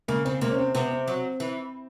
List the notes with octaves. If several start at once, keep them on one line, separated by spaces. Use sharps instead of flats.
C#3 A#3
C#3 C4
C3 A#3
C#4
C4
C3 B3
C4
F#3
E3